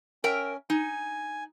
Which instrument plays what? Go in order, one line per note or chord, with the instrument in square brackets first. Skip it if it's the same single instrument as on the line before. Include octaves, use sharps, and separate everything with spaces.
[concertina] C#4 [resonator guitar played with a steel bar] A#4 E5 G5
[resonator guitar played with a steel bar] D#4 [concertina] G#5